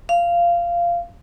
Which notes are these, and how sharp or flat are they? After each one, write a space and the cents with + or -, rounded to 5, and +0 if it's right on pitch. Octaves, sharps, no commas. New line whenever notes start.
F5 -15